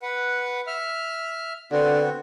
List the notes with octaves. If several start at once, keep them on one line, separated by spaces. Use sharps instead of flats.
B4 F#5
E5 F6
D3 B3 C4 F#4